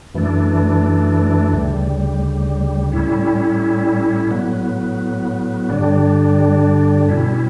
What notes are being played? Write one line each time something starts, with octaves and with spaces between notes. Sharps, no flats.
F#2 E3 A3 D4
D2 C#3 G3
A2 G3 C#4 E4
A2 F#3 B3
G2 D3 G3 D4
B2 G3 C#4 E4